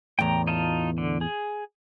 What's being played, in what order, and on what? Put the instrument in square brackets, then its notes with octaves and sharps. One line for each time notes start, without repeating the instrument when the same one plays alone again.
[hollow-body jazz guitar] E2 A2 [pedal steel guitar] G5 A#5
[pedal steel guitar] D#4 F4 A5
D3
G#4